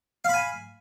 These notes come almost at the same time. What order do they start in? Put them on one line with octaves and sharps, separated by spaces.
F5 B5 G#5